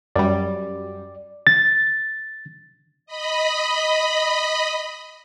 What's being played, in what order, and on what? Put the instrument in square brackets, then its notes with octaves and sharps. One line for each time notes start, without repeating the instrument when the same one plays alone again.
[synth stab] F#2 G3 [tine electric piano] D5
[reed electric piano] A6
[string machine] D#5 B5